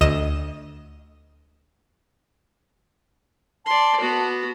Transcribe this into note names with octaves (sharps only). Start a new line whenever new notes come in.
D2 D#5 E7
D5 A5 C6
B3 F#4